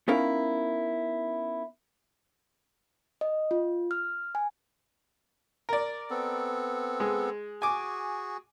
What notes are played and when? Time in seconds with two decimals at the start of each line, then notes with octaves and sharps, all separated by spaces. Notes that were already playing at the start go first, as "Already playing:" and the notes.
0.08 B3 C#4 D#4 E4 A#4 F5
3.21 D#5
3.51 F4
3.91 F6
4.35 G#5
5.69 A#4 D5
6.10 B3 C4 A4
7.00 G#3
7.62 F#4 G#4 G#5 D6